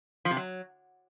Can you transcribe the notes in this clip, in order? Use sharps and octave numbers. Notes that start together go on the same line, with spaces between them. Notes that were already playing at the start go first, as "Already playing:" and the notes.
F3
C3
F#3